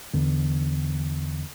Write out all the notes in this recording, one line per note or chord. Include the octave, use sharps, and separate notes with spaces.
E2 D3